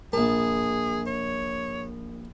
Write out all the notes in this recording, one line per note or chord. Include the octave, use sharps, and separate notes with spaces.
A#1 G#4 A#4 A5
C#5